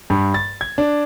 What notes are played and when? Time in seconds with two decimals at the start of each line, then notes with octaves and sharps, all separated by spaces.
0.10 G2
0.34 A6
0.61 G#6
0.78 D4